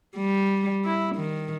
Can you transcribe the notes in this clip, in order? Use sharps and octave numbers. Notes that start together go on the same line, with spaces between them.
G3
E4
D#3